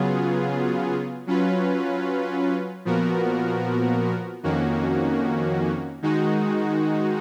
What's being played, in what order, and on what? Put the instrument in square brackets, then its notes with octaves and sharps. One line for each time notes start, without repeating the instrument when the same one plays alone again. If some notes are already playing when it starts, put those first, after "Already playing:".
Already playing: [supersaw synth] C#3 F#3 B3 F4 G#4
F#3 C#4 F4 B4
A#2 F3 B3 F#4 A#4
F2 D#3 A#3 C#4 F#4
D#3 G#3 D#4 F#4